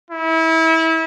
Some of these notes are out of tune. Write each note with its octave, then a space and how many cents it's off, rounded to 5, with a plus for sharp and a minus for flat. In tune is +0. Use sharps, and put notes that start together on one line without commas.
E4 -30